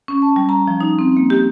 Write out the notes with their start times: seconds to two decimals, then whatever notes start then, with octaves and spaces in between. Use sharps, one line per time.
0.08 C#4
0.22 A5
0.36 G3
0.49 A#5
0.67 F3
0.80 D#4
0.99 C4
1.17 A#3
1.30 G4